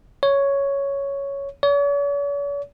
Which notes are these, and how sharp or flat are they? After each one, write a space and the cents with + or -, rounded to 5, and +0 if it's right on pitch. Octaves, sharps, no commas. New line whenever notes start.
C#5 +5
C#5 +45